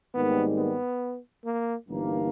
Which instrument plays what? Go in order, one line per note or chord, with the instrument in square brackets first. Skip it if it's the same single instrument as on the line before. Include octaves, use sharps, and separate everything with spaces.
[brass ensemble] G#1 G#2 D#3 G3 A#3 [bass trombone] B3
[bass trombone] B3
A#3
[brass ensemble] G1 G2 E3 A#3 D#4